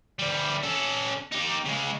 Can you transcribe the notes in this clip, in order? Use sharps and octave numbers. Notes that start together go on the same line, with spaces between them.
D2 G3
C#4 A4
D#4 G4
C#3 G#3